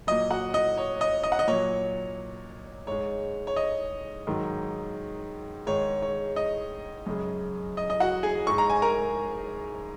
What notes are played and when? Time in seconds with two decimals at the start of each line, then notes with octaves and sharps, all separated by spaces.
0.07 A#2 F#3 D#5
0.30 F#4 F#5
0.54 D#5
0.77 C#5
1.01 D#5
1.23 D#5
1.32 F#5
1.39 D#5
1.47 A#2 F#3 C#5
2.87 G#2 G#3 C#5
3.47 C#5
3.56 D#5
4.27 G#2 D#3 F#3
5.67 G#2 D#3 G#3 C#5
6.02 C#5
6.36 D#5
7.06 F#2 C#3 G#3
7.77 D#5
7.90 D#5
8.00 F#4 F#5
8.23 G#4 G#5
8.47 G#2 G#3 C#6
8.58 A#5
8.70 G#5
8.82 A#4 A#5